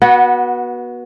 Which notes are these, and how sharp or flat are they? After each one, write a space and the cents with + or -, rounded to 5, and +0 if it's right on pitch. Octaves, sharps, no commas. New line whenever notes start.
B3 -25 F#4 +0